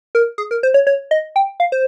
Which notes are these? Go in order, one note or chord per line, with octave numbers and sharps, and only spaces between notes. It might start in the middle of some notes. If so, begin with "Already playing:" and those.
A#4
G#4
A#4
C5
C#5
C#5
D#5
G5
F5
C5